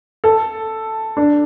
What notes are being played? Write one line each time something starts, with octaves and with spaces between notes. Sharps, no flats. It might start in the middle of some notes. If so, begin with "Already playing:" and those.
A4
D4